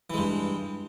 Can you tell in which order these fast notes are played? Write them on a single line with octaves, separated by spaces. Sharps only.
E3 G#3 G2